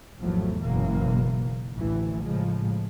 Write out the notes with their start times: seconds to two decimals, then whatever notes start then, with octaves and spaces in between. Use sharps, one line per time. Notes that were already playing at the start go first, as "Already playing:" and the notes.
0.21 G#1 E2 F3 F#3 A3
0.61 F#1 B2 E3 A#3
1.76 A1 D2 E3
2.22 A2 C#3 F3 G#3